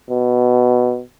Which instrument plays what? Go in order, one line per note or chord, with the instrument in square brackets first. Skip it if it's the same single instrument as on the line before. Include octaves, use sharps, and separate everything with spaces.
[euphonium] B2